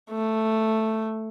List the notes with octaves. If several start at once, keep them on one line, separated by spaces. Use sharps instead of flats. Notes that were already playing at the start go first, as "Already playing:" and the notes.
A3